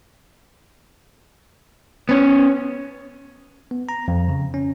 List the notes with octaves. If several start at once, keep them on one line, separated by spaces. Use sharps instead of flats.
B3 C#4
B3
A#5
F2
C#3
C#4